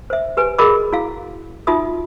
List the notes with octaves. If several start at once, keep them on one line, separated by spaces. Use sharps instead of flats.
C5 E5
G4 B4 G#5
F#4 G#4 A#4 D#5 B5 D6
E4 F#4 F5
D#4 F4 F#4 E5 D#6